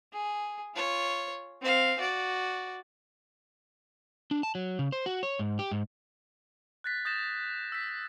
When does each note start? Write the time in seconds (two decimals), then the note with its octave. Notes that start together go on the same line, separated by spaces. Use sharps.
0.13 G#4
0.75 F4 C#5
1.62 C4 F5
1.99 F#4 D5
4.31 D4
4.43 A5
4.55 F#3
4.79 C#3
4.92 C5
5.06 F#4
5.23 C#5
5.39 G#2
5.59 G4
5.72 G#2
6.84 F#6 A6 B6
7.05 D#6 G6 A6 A#6 E7
7.72 E6 B6